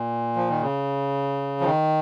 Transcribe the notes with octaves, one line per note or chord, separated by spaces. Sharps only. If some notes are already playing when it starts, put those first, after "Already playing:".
Already playing: A#2
F3
D#3
C#3
F3
D#3